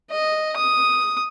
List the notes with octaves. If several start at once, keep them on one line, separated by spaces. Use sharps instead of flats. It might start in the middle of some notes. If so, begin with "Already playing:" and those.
D#5
D#6